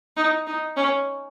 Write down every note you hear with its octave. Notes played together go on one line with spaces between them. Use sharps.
D#4
D#4
C#4